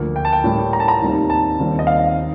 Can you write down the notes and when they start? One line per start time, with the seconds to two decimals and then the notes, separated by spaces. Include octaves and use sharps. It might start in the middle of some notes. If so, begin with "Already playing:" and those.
Already playing: D2 D3 F3 A#3
0.16 G5
0.25 A5
0.33 G5
0.44 A2 G3 A#3
0.73 A#5
0.80 A5
0.88 A#5
1.01 D#2 D#3 G3 C4
1.30 A5
1.59 D#2 D#3 G3 C4
1.79 D#5
1.87 F5
2.19 D#3